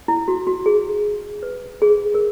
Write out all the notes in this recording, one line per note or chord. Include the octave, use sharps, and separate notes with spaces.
E4
F#4
F#4
G#4
B4
G#4
A#4